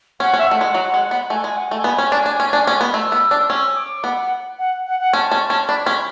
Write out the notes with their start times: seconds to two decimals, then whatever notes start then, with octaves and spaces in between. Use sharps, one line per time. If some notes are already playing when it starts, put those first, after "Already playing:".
0.20 C#4 F#5
0.34 C#4
0.39 E5
0.47 A3 F#5
0.61 G#3
0.75 F#3
0.94 G#3
1.11 B3
1.30 A3 G#5
1.43 G#3 G#5
1.57 F#5
1.71 A3 G#5
1.84 B3
1.98 C#4
2.12 D4
2.26 D4
2.40 C#4
2.53 D4
2.67 C#4
2.81 B3
2.94 A3 E6
3.12 B3
3.31 D4
3.50 C#4 E6
3.76 D6
4.04 B3 F#5
4.59 F#5
4.87 F#5
5.00 F#5
5.13 C#4 A5
5.31 C#4
5.50 C#4
5.69 D4 B5
5.86 C#4